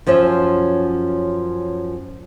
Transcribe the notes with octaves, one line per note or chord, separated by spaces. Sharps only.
F#2 F3 C#4 C5 E5